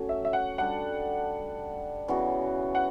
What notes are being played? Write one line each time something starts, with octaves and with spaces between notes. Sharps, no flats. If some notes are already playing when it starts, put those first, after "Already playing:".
Already playing: F#3 A3 C#4
E5
E5
F#5
G3 D4 A4 F#5
C#3 E3 B3 F#4
F#5